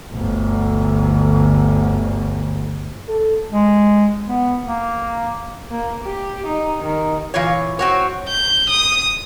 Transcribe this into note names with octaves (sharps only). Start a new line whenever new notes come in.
G1 D2
A4
G#3
B3
A#3
A#3
G4
D#4
D#3
A#2 E3 F4 C#5
C4 F#4 C#5
G6
D#6